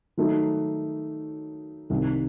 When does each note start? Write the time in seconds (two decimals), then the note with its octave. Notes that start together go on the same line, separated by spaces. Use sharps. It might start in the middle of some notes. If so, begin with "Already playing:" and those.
0.17 D#3 F#3 A3 D#4
1.90 C2 C3 D#3